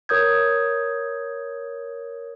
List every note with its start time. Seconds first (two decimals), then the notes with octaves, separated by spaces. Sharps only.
0.09 A#4 C#5 D#6 G6 G#6